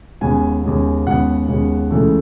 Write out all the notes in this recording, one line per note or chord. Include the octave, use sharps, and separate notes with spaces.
D#2 C#3 G#3 B3 G#5
D#2 C#3 G#3 B3
D#2 C#3 G#3 B3 F#5
D#2 C#3 G#3 B3
C#2 C#3 E3 A3